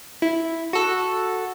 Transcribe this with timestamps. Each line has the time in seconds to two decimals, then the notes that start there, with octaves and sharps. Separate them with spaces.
0.22 E4
0.73 F#4 A4